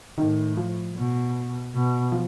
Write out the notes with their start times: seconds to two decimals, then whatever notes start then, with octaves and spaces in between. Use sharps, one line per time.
0.18 A2 D#3
0.57 F3
0.95 B2
1.74 B2
2.12 F3